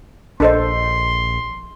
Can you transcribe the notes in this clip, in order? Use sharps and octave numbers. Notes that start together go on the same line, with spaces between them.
A#1 D4 A4 A#4 C5 D#5 C6